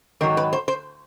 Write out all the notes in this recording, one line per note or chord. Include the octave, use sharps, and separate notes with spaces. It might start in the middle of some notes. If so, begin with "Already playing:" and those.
G#2 D#3 F#3 A#4
B4
C5
C5